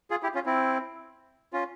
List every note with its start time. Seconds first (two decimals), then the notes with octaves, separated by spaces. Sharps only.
0.11 F4 G#4
0.23 E4 G4
0.34 C#4 F4
0.46 C4 E4
1.53 C#4 F4